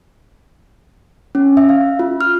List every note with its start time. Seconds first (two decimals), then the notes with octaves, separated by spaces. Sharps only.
1.35 C#4
1.57 E5
1.69 F5
1.99 F4
2.21 F6